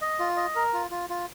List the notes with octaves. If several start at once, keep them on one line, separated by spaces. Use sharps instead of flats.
D#5
F4
D#5
A#4
F4
F4
F4